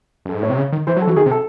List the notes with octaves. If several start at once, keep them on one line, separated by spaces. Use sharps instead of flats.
F#2
A4
G#2
A2 C#5
C3
C#3
D#3
E3 C5
F#3
A4
E3 F#4
D#3 G#4
C3
A4